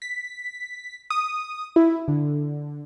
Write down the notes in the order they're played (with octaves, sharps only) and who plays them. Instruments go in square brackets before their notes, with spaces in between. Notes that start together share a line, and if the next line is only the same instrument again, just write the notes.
[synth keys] B6
D#6
E4
D3